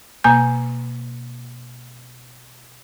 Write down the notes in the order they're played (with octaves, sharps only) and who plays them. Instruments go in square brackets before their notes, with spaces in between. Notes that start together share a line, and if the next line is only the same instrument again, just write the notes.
[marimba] B2 A#3 G#5 G6